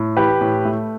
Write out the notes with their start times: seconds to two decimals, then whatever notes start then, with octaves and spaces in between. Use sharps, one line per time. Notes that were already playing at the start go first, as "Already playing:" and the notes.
Already playing: A2
0.17 E3 G4 B4
0.41 A2
0.65 A3